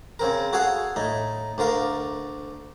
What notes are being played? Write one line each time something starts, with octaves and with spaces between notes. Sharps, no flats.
C#3 C4 A#4
F#4 G#4 A4 F5 F#5
A2 D#4
D2 D3 A#4 F5